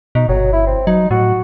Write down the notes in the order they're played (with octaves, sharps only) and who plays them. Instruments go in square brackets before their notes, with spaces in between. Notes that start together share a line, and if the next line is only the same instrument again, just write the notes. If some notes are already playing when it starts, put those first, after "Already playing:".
[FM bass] B2 [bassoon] D#4
[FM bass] G1 [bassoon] F#3
[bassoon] E4
C4
[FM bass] F#3 [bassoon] D#4
[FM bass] A2 [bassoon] F#4